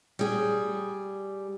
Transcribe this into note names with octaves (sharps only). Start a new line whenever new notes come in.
G3 G#4